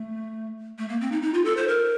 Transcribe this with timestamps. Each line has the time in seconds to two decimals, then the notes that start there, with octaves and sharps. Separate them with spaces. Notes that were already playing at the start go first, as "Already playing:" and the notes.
Already playing: A3
0.78 A3
0.89 A#3
1.01 C4
1.12 D#4
1.23 D#4
1.34 F4
1.45 A4
1.57 C5
1.68 A#4